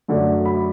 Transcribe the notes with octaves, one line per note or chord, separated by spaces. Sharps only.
F#2 D3 F#3 A3
B5